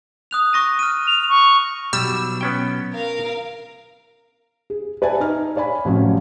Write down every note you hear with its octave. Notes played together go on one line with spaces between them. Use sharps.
D#6 F#6 F7
C#6 A#6 D#7
F6 D#7
F7
C#6
B2 F#3 G3 E6
B3 C#4 G5
A#4 F5
G#4
B4 D5 E5 G#5 A5
D#4 F6
C#5 D5 G#5 B5
A1 C3 F3 F#3 C#4